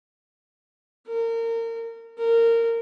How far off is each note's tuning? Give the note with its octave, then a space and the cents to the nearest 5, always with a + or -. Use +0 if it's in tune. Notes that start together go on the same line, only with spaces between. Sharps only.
A#4 -30
A#4 -20